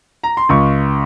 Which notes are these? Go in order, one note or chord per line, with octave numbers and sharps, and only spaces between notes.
A#5
C6
C#2 C#6